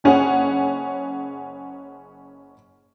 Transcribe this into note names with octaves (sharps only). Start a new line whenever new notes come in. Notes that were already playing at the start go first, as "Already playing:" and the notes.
F#1 C#4 G#4 F#5